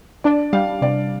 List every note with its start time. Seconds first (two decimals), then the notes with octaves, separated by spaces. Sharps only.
0.24 D4 D5
0.53 G3 F5
0.81 C3 D5